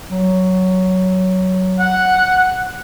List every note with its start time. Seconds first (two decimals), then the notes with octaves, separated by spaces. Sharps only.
0.09 F#3
1.79 F#5